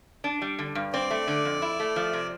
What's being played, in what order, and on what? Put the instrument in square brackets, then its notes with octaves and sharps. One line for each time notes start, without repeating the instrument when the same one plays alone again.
[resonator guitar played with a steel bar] D4
G3
D3
G2
[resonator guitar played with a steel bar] C4 [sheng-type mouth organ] D5
[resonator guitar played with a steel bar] A3
D3
F2
E4
A3
F3
C3